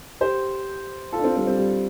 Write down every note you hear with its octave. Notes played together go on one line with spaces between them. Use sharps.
G4 C5
F4 A4
D4
C4 F4
G3 C4
G3 C4
G3